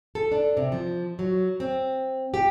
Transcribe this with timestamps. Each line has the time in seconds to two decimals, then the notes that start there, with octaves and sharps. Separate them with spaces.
0.15 A4
0.32 D4
0.57 C3
0.72 F3
1.19 F#3
1.60 C4
2.34 G4